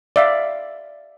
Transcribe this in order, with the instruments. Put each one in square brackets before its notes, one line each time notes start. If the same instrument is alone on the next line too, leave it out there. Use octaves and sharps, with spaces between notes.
[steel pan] D5 E5 F5